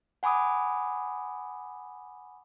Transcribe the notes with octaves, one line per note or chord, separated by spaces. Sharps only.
F#5 G#5 B5 D6 D#6